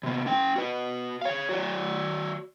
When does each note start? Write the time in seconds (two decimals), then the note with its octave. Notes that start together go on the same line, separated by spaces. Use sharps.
0.03 C3 B3
0.26 C#4 G5
0.56 F#4 B4
1.21 C#5 F5
1.49 F#4 C#5 D5